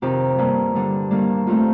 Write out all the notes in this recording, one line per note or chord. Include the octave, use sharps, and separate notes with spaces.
F2 C3 D#3 G4
G2 D#3 G3 A#3
D3 G3 D4
G2 D#3 A#3 D4
G2 D#3 A3 C4 F4